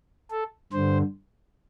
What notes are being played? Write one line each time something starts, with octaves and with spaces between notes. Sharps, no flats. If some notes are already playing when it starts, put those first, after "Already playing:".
A4
G2 D3 C5